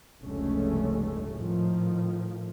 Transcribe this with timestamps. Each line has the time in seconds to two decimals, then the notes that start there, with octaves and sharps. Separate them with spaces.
0.21 F1 C#2 G2 G#3 A3 C#4
1.30 A2 D#3 F3